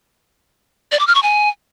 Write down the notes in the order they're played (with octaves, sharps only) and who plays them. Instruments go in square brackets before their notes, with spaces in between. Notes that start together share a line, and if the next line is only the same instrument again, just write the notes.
[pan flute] D5
D6
F6
C#6
G#5